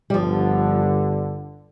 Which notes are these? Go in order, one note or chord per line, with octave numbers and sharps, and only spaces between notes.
G3
G1 G2 D3 F3